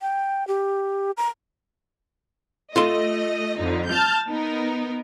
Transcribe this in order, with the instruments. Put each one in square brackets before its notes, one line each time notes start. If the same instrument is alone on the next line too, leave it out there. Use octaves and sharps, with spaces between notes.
[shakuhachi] G5
G4
A#5
[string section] A3 D#5 [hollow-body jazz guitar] F4 A4 C6
[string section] F2 D3 D#4
A5 F6 G6
B3 D#4 A#4